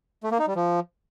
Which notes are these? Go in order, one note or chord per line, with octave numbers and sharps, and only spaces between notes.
A3
A#3
D#4
G3
F3